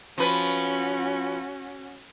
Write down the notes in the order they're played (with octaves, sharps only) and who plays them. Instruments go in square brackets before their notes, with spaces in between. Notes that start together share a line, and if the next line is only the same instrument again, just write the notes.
[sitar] F3 B4 [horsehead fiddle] C#4 F#4